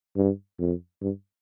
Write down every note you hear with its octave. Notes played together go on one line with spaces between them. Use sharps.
G2
F2
G2